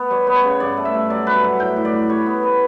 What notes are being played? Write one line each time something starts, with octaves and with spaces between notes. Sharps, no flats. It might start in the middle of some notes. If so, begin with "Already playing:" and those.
Already playing: B3
G3 C#5
B3
C#5
C#3
G2 D5
A3
E5
G2
F#3 D5
G2 B4
F#3 F#5
A2 G5
A2
D5
G3
G3 C#5
B3
B3